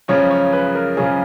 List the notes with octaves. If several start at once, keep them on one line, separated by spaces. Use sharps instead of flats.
F#2 C#3 F3 G#3 C#4 C#5
C#5
B4
A#4
F#2 C#3 F3 G#3 C#4 G#4